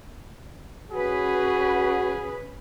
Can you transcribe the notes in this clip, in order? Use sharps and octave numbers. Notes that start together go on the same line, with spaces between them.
C#4 F#4 G#4 B4